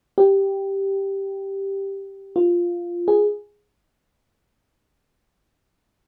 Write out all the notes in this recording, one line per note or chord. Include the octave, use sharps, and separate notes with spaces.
G4
F4
G#4